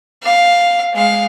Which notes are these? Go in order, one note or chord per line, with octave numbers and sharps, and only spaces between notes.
F5
G#3 F5